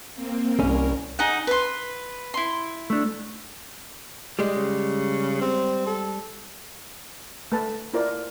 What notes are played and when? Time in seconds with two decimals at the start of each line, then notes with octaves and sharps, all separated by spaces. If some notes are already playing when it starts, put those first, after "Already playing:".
0.14 A#3 C4
0.60 C2 C#4 A#4
1.19 D#4 G#4 F#5
1.47 B4 C6
2.34 E4 C6
2.90 A3 D4
4.39 G3 G#3
4.56 C#3
5.41 C4
5.86 A4
7.52 A3 B4 A5
7.94 E4 F4 A#4 C5 D5